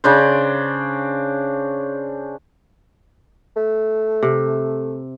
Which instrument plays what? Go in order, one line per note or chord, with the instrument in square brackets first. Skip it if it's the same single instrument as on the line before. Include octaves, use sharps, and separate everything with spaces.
[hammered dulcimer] C#3 D4 C5
[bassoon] A3
[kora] C3